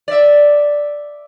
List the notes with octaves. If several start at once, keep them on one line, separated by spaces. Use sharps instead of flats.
D5 E5